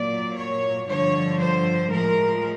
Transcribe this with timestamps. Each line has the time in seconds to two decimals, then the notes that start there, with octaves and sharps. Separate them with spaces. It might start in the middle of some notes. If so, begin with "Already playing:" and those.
Already playing: A#2 F#3 A#3 D5
0.36 C#5
0.87 G2 D3 F3 C#5
1.39 C5
1.91 A2 F3 G#3 A#4